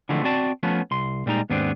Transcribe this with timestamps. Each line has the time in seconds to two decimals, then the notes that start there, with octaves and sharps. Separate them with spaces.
0.09 D3 E3 F3 G#3 A3 C4
0.24 C4 F#4 D5 A5
0.63 F3 A3 B3 C#4
0.91 C2 C6
1.26 A#2 G3 G#3 D#4 A#5
1.50 D#2 G#2 B3 C4 D4